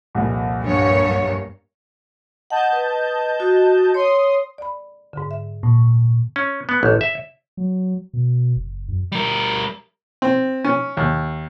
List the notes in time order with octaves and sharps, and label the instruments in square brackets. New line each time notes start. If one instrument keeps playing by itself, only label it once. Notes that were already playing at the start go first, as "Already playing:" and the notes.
[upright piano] C2 F2 A#2
[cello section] G2 A#3 C#5
[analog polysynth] D#5 A5 G6 [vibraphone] F#5
[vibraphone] B4
F#4
[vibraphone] C#5 [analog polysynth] C6 D#6
[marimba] D5 B5
G#2 D3
E5
[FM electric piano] A#2
[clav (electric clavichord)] C#4
B3
A1
E5
[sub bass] F#3
B2
F#1
F#2
[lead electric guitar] G3 A#4
[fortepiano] C4
C#4
D#2